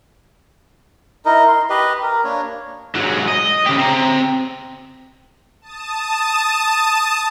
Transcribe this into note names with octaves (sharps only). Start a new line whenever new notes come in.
D#4 E4 A#4 D#5
C6
G4 B4 D#5
A#4
A#3 D4 C#5
G#2 F#3
D#5
C#3 G4
C4 A#5
A5 D#6